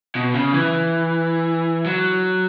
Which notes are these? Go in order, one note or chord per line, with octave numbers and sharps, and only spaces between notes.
B2
C#3
E3
F#3